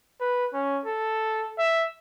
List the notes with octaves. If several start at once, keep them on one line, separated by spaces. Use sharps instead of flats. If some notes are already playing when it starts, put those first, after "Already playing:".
B4
C#4
A4
E5